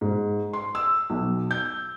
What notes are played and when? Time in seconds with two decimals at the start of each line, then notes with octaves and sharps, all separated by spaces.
0.01 G#2
0.53 C6
0.75 E6
1.10 B1
1.51 G6